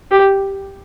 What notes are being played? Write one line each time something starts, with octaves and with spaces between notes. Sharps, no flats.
G4